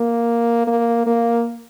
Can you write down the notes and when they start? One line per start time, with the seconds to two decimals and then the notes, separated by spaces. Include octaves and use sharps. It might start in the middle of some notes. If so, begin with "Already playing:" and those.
Already playing: A#3
0.67 A#3
1.06 A#3